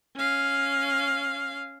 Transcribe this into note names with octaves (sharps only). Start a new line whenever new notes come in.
C#4 F5